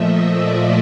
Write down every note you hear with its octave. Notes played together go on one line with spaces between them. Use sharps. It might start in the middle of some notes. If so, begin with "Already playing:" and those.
Already playing: A#2 F3 A3 D#5 E5
D5